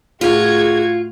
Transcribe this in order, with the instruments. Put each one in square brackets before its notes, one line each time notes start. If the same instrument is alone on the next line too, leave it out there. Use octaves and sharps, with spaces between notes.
[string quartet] A2 F#4 G#6 [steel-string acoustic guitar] F4 [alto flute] G#4